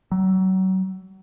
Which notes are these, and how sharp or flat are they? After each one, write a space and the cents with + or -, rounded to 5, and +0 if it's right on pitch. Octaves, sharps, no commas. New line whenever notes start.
F#3 +30